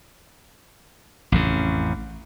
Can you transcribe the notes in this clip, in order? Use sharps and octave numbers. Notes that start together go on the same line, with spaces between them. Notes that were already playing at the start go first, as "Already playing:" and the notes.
A1 F2 C#3